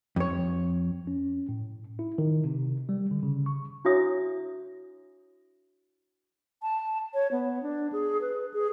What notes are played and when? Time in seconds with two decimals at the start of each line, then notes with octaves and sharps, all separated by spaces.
0.16 F2 C#5
1.07 C#4
1.49 A2
1.99 E4
2.18 D#3
2.44 C3
2.89 G3
3.11 D3
3.23 C#3
3.46 C#6
3.85 D4 E4 F#4 C#5 E5 D#6
6.63 A5
7.14 C#5
7.32 B3
7.63 D4
7.92 G#4
8.21 B4
8.54 G#4